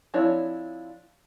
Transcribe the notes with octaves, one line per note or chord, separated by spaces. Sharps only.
F3 C4 D4 E4 C#5